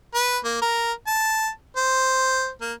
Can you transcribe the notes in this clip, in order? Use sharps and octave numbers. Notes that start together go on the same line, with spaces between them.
B4
A#3
A#4
A5
C5
A#3